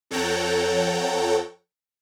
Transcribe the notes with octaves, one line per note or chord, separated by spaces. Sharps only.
F2 A4 C#5 F#5 G5 A#5